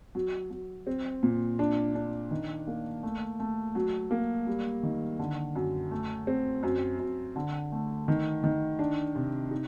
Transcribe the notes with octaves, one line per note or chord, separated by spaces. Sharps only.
F#3
F#3
C4
A#2
D4
D4
D#3
A#3
A3
A3
F#3
A#3
G3
D#3
D3
F#2
A3
C4
F#2
F#2
D3
A3
D#3
D#3
D4
C3
D#4